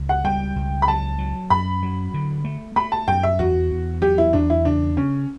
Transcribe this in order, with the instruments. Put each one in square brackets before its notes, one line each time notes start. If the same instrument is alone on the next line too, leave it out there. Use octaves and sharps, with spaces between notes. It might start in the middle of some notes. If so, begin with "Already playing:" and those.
Already playing: [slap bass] C#2
[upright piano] F#5
[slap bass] G3 [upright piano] G5
[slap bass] C#2
[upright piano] B5
[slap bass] F#3 [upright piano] A5
[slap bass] F#3
[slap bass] F#2 [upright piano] B5
[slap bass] F#3
D3
A3
[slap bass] A3 [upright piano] B5
[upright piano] A5
[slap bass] F#2 [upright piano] G5
[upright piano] E5
[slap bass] E2 [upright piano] F#4
[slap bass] E2
[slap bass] F#3 [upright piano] G4
[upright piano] E4
[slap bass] E2 [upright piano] D4
[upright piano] E4
[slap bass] C#3 [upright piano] D4
[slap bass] C#3 [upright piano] C#4